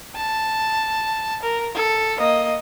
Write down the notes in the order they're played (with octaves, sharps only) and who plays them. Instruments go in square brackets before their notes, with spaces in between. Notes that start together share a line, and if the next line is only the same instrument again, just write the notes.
[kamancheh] A5
A#4
A4
A#3 D#5